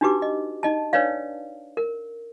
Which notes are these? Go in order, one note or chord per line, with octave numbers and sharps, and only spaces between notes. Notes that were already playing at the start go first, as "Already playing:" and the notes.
D4 D#4 F#4 G4 B4 D6
D#5
D#4 D#5 A5
D4 B4 C#5 D5 F5
A#4